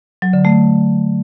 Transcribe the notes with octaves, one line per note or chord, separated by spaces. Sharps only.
F#3
D3
A3